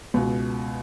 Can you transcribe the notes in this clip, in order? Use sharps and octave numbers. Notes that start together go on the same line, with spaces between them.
C#2 B2